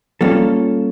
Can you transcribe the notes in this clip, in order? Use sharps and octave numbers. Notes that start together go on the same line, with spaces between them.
G3 A#3 C#4 F4 A4